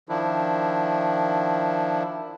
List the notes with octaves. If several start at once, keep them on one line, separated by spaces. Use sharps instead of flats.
D#3 F3 D4 E4